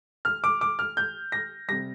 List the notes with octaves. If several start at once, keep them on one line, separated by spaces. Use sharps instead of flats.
F6
D6
D6
F6
G6
A#6
C3 G3 A#6